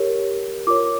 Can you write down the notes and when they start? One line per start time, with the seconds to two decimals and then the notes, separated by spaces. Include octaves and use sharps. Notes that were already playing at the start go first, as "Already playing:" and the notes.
Already playing: G4 A#4 C#5
0.67 F4 A#4 C#5 D6